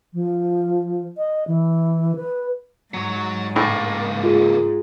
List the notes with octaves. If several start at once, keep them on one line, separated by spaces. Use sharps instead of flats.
F3
D#5
E3
B4
G#2 F#3 C#5
C#2 A2 A#3
F4 G#4